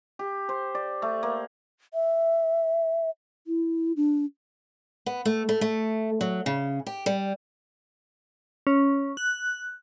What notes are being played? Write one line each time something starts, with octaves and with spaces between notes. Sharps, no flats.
G4
C5
D5
A3
A#3
E5
E4
D4
B3
A3
A3
A3
F#3
C#3
G4
G3
C#4
F#6